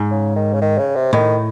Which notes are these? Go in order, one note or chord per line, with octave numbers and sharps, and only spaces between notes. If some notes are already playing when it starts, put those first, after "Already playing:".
Already playing: G#2
C#3
D#3
C#3
D#3
C#3
C3
A2 D#3